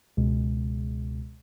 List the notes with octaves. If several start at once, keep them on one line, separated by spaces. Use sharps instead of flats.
C#2 B2 G#3